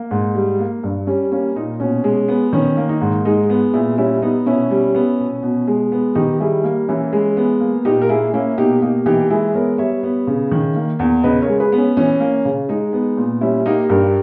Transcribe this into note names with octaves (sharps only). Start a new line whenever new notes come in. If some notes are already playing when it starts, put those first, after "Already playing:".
Already playing: A#3
G#2
G3
A#3
G2
G3 C#4
A#3 C#4
A#2 D#4
B2 C#4
G#3
B3
D#3 C#4
A#3
D#4
G#2
G#3 D#4
B3
A#2 E4 G#4
G3 C#4 E4
B3 D#4
B2 C#4 E4
G3
B3
B2
B2
G#3
B3
D#3 D#4 G4
G3 E4 G#4
A#3
E3 C#4 E4
G#3
B3
A#3
A#2 D#4 G4
A#4
A#3 E4 G#4
A#3 C#4 E4
B2 D#4 G4
A#3 D#4 G4
E3 D#4 G4
G#3 E4 G#4
B3 A#4 C#5
G3 C#5 E5
B3
C#3
D#3
A#3
E2
C#3 B4 D#5
A#4 C#5
G#3
G#4 B4
B3
C#4
E3 C#4
A#3
C#3
G#3 D#4
B3
A#2
G3 C#4 E4
A#3 D#4 G4
G2 G4 A#4